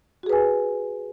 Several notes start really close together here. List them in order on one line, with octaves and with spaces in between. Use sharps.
F#4 G#4 B4 G#5